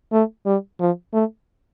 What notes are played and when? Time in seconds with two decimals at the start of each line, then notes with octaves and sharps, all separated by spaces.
0.12 A3
0.46 G3
0.80 F3
1.13 A3